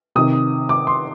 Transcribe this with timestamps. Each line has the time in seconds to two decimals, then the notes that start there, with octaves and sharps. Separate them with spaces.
0.15 C3 D#3 D#6
0.69 D6
0.87 C6